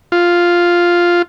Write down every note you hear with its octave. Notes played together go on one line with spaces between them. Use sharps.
F4